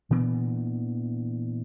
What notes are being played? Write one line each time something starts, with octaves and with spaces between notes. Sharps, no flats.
A#2 E3 B3 D4